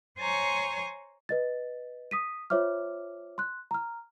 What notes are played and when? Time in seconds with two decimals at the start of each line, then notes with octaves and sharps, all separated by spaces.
0.19 C5 C#5 G#5 A#5 C6 C#6
1.29 B4 D#5 A6
2.11 D#6 B6 D#7
2.50 F4 C5 C#5 E5 D6 F6
3.38 C6 F#6
3.71 A#5 F6